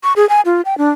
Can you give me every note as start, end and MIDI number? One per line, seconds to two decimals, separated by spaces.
0.04 0.13 85
0.16 0.28 68
0.29 0.41 80
0.45 0.61 65
0.65 0.78 79
0.78 0.91 62